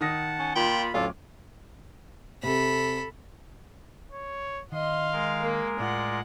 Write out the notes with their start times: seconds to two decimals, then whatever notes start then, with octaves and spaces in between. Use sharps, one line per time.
0.01 D#3 F#5 A5 D#6 A#6
0.39 C#4
0.56 A#2 F4 G5 B5
0.94 D1 C#4 F4 A4 D6
2.43 C3 A4 B5
4.12 C#5
4.72 D#3 D#5 F5 C6
5.13 G#3 A#4
5.41 A#3
5.80 A2 F4 D5 F#5